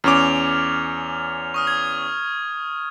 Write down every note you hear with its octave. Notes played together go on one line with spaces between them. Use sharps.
E2 C#4 D6 F6 F7
C#6 D#6 F6
G#6